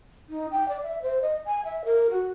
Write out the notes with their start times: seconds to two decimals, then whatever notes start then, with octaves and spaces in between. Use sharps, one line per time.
0.30 D#4
0.51 G5
0.69 D5
0.83 E5
1.02 C5
1.22 D#5
1.46 G#5
1.65 E5
1.85 A#4
2.10 F#4